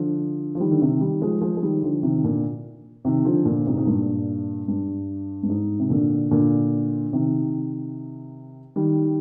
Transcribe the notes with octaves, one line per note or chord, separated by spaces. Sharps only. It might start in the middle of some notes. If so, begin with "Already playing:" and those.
Already playing: D3 F3
F3
D#3 G3
D3
C3 D#3
D#3 G3
F3 G#3
F3 G#3
G#3
D#3 G3
D3 F3
C3 D#3
A#2 D3
C3 D#3
D3 F3
A#2 D3
G#2 C3
G#2
G2 A#2
G2
G2
G#2
C3
A#2 D3
A#2 D3
C3 D#3
D#3 G3